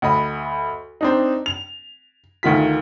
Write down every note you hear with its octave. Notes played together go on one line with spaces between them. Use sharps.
D2 D#5 B5
C4 D4 D#4
F7
D2 D#3 F4 B6